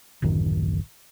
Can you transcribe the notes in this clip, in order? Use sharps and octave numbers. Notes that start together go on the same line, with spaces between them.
D1 A1 F#2 D#3